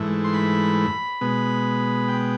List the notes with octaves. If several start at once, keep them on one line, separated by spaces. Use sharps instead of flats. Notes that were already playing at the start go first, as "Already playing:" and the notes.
Already playing: G#2 E3 A3
C6
B5
B2 G#3 B3
G5